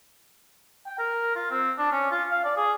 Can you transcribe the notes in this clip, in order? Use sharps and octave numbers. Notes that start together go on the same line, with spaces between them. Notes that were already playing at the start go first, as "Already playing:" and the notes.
G5
A#4
F4
C4
D4
C#4
F4
F5
D5
G#4